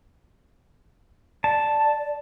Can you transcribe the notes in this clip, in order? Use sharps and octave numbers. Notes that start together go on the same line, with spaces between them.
D5 A5